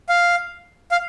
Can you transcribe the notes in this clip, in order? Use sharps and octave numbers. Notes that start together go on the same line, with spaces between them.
F5
F5